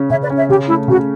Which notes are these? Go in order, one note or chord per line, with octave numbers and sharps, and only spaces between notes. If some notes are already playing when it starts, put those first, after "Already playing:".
Already playing: C#3 C#4
C#3 C#5 E5
B4 D5
C#4
C#5 E5
C#3 G4
A3 E4
C#3 F#4